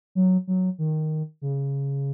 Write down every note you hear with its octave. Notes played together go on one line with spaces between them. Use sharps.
F#3
F#3
D#3
C#3